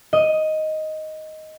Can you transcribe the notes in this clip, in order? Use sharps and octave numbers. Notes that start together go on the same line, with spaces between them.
D#5